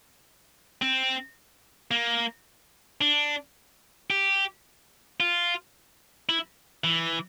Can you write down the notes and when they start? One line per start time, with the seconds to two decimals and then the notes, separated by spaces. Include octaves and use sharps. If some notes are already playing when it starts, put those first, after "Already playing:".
0.82 C4
1.91 A#3
3.01 D4
4.10 G4
5.20 F4
6.29 E4
6.84 E3